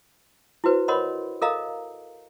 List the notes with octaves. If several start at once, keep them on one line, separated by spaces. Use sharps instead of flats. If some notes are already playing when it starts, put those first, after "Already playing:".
E4 F#4 B4 C5
A#4 C#5 D#5 F#5 B5 C6
A4 A#4 D#5 F5 A#5